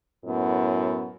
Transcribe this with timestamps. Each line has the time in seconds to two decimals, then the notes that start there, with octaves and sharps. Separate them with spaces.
0.24 F#2 A2 B3